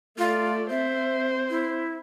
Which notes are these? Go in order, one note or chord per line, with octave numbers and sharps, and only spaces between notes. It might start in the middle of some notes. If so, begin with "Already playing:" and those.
A3 F4 D5
C4 C5 E5
E4